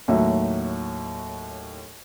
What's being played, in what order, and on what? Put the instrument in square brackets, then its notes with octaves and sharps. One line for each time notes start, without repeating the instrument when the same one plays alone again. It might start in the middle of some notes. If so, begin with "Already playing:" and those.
[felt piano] D#2 A2 F#3 E5